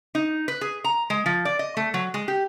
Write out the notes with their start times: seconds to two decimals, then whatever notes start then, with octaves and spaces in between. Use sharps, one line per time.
0.15 D#4
0.48 B4
0.61 G#4
0.84 A#5
1.10 G#3
1.26 F3
1.45 D5
1.59 D#5
1.77 A3
1.94 F#3
2.14 G#3
2.28 G4